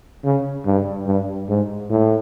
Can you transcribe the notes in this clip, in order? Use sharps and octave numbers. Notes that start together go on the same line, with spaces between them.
C#3
G2
G2
G#2
A2